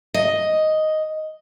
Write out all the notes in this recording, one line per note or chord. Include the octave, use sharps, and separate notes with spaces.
D#5